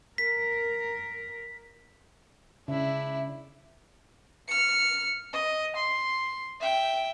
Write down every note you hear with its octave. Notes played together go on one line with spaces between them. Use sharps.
A#4 B6
C#3 D4 E4 E5
F6 C#7
D#5
C6
E5 G5